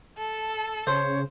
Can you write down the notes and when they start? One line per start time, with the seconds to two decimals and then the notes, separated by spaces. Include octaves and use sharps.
0.18 A4 A5
0.87 C#3 C5 C#5